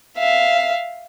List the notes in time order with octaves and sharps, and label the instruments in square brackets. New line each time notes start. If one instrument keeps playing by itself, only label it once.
[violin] E5 F5